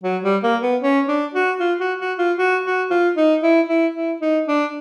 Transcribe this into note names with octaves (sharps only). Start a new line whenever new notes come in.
F#3
G3
A#3
B3
C#4
D4
F#4
F4
F#4
F#4
F4
F#4
F#4
F4
D#4
E4
E4
E4
D#4
D4